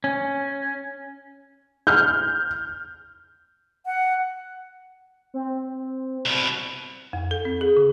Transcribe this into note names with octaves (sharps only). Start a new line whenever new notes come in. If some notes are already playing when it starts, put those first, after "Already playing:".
C#4
F6 G6
F#5
C4
C2 B2
F2
A4
C4
G#4
C#3